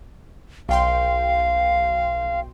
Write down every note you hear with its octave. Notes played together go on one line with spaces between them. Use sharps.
B1 F5 G5 C6